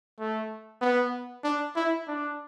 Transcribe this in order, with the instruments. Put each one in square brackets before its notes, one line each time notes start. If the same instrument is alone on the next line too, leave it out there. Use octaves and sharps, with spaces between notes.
[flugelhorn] A3
B3
D4
E4
D4